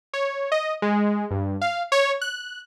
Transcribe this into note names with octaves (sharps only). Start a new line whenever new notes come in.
C#5
D#5
G#3
G2
F5
C#5
F#6